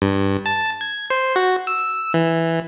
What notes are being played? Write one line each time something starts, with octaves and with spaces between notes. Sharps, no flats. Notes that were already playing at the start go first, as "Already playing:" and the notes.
G2
A5
G#6
C5
F#4
E6
E3